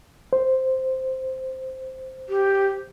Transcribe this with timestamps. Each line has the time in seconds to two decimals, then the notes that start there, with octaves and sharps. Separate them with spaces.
0.33 C5
2.29 G4